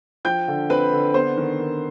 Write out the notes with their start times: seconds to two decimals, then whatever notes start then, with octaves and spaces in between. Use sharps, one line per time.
0.25 F3 G5 G6
0.48 D3
0.70 C4 B4 B5
0.92 D3
1.14 B3 C5 C6
1.37 D#3
1.60 D#3